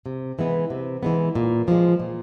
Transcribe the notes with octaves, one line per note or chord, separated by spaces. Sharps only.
C3
E3 G#3 B3
C3
E3 G#3 B3
A#2
F3 G#3
A#2